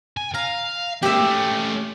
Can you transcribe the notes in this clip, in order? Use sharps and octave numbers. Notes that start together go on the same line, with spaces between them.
G#5
F5 A#5
A#2 G#3 G4 E5
A3 C#4